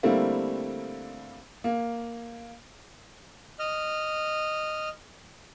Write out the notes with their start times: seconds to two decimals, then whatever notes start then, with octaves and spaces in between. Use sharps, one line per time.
0.03 D3 G3 A3 A#3 C4 E4
1.64 A#3
3.59 D#5 F6